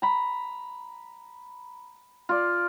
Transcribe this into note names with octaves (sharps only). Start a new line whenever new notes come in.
A#5 B5
F4 D5